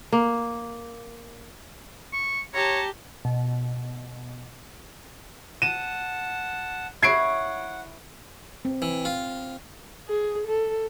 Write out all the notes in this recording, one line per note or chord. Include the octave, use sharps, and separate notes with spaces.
A#3
C#6
G4 C#5 A5 A#5
B2
F#5 A5 D#7 E7
E4 C#5 F#5 G#6 C7 D7
C4
E3
F4
G#4
A4